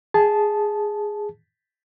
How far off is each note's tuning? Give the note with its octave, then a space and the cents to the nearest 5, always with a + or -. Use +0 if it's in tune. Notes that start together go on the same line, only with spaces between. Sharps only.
G#4 +0 A5 -15